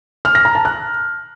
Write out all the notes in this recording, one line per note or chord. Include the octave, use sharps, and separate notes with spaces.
F6
A#6
A#5
A5
F#6